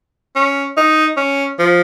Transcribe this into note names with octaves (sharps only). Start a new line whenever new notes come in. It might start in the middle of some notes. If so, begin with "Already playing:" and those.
C#4
D#4
C#4
F3